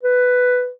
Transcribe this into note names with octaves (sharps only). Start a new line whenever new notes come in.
B4